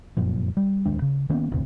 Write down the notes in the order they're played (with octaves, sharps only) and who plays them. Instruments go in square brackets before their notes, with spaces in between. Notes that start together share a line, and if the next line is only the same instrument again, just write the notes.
[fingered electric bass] F1 F#2 A#2 F3
G3
D1 D#2 G#3 D4
C#3
D#3 A#3 B3 C#4
E1 A1 D2 C3